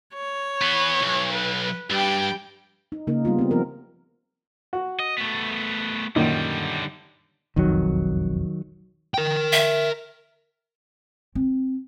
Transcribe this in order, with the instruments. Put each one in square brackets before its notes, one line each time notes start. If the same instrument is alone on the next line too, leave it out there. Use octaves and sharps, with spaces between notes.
[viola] C#5
[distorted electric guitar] E3 B3
B1
[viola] B4
[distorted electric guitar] G2 [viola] G3 G5
[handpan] D#4
C#3 A#3 D#4 A#4
G3 B3 F4
B3 C4
F3 B3 C4 A#4
[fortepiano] F#4
[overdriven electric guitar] D#5
A3 B3
[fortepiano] F#2 A#2 D#3 [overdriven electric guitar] D3 G3
[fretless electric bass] E1 B1 F2 [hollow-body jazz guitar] D#3 F#3
[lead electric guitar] A#4 G5
[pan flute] E5
[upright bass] C4